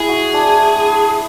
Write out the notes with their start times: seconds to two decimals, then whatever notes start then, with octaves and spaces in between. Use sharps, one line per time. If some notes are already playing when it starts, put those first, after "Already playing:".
Already playing: E4 G#4
0.08 F#4
0.34 D4
0.59 A3